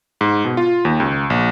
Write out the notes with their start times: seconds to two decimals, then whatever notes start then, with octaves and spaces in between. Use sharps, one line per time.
0.21 G#2
0.45 B2
0.57 F4
0.85 D#2
1.00 C#2
1.30 A#1